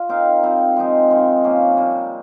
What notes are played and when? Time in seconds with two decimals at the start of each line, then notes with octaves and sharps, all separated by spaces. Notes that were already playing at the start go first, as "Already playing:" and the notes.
Already playing: F4 D#5
0.09 C4 D#4 A#4 F5
0.43 G3 C4 F4
0.77 F3 G#3 C4 D#4
1.10 D#3 G#3 C4 F4
1.44 F3 A#3 C#4
1.77 C3 G3 A#3